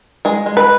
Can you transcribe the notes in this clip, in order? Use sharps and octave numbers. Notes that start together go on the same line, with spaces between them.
G#3 G#4
G#3
B4